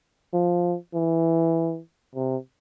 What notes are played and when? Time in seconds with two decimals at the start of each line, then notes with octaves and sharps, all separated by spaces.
0.33 F3
0.94 E3
2.15 C3